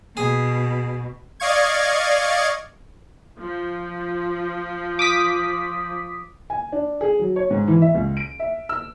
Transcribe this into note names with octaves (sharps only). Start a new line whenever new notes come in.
B2 G#4
D5 D#5 F5 C#6 G#6
F3
D6 D#6 B6
G#5
D4
G#4
F#3
C#5
G#2
E3
E5
C#2
D7
E5
E6